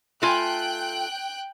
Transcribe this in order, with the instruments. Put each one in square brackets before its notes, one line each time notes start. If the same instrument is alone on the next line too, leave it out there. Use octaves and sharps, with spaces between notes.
[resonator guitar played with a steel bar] A3 F4 G#5 [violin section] G5 F#6